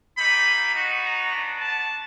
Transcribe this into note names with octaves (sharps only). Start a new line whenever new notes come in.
G3 A#3 D#4 B5
B3 D#4 F#4
A#5
B3 D4 F#4
A5